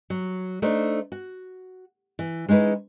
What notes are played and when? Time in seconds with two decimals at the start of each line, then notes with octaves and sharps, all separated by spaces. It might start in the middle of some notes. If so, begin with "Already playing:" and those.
0.10 F#3
0.62 A3 D4 D#4 C5
1.12 F#4
2.19 E3
2.49 G#3 C#4 D#4 E4 B4